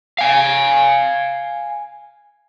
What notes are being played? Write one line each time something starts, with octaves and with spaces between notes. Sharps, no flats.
F5 G#5